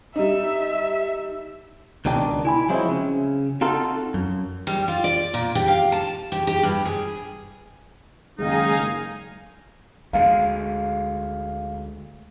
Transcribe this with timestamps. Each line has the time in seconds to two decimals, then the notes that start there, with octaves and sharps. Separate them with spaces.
0.16 G3 D#4 E5
2.05 C#2 B2 D#3 D4 G5
2.45 E4 G#5 B5
2.69 F3 F#3 G#3 C4 E4
2.89 C#3
3.61 C4 D#4 F4 F#4 A4
4.14 F#2
4.67 G3
4.88 F4
5.04 D5
5.34 A#2
5.55 G4
5.68 F5
5.92 A5
6.32 G4
6.47 G4
6.63 G2
6.85 G#4
8.39 F#1 D#3 G#3 D#4 F5 G#5 A#5
10.13 D2 G#3 F5